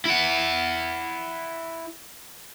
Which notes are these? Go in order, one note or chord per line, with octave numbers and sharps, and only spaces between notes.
E4 F#5